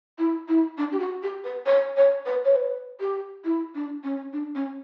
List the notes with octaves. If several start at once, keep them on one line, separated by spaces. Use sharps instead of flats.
E4
E4
D4
G4
F#4
G4
B4
C#5
C#5
B4
C#5
B4
G4
E4
D4
C#4
D4
C#4